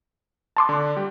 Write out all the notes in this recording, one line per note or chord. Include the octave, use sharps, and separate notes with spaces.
A5 C6 D6
D3 D4
G3 G4